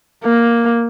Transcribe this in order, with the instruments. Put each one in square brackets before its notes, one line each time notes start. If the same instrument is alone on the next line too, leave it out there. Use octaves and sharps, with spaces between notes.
[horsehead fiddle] A#3